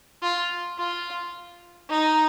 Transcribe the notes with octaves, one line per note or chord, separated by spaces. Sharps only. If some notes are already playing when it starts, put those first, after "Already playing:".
F4
F4
D#4